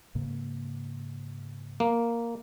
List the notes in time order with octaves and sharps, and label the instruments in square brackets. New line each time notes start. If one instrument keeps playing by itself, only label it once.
[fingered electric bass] G#2 C#3 A#3
[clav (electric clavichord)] A#3